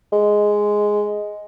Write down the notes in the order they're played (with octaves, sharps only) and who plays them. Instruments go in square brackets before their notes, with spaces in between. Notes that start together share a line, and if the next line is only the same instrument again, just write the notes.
[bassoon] G#3